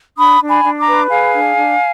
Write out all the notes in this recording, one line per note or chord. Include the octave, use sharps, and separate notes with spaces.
D4 B5 D#6
D4
G#5 B5
D4
A#5 D6
B4
G#4 F5 G#5
D4
D4